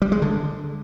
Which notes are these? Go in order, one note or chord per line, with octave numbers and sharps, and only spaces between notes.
G3
G#3
D3